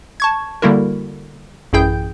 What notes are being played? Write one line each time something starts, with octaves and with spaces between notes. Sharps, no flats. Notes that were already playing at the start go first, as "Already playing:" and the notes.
A5 C#6 G#6
D3 G3 A#3 E4 F#4 A#4
A1 F#2 E4 G#4 G5 G6